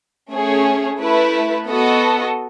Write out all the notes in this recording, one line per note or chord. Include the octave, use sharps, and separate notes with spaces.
A3 C#4 G#4 C#5
A3 E4 B4
B3 F#4 A4 D#5